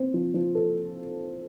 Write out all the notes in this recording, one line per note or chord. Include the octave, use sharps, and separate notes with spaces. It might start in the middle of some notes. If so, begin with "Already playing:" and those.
Already playing: C4
F3
F3
A4